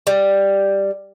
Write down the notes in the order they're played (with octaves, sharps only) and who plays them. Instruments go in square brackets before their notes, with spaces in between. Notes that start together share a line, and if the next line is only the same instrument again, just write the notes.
[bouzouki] G3